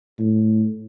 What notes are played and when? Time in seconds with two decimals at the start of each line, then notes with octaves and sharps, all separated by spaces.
0.19 A2